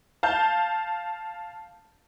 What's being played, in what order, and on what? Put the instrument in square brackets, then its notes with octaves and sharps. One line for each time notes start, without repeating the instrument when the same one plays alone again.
[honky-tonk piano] F5 A5 G6